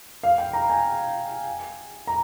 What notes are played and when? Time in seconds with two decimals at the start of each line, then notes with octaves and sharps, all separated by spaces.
0.23 F5
0.38 G5
0.53 A#5
0.70 G#5
2.07 A#5